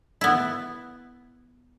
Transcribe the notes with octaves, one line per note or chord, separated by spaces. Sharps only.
B3 E4